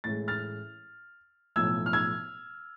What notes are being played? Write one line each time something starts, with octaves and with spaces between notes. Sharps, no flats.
A1 A2 G#3 A6
F6 A6
B1 A2 F3 E6 G#6
F6
E6 G#6